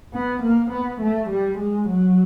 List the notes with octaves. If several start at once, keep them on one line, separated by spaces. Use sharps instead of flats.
B3
A#3
B3
A3
G3
G#3
F#3